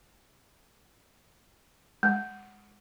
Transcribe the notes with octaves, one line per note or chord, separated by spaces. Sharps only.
G#3